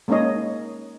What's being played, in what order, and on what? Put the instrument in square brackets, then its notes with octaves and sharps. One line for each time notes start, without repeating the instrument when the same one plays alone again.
[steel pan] G#3 A#3 C#4 D#4 C#5 D#5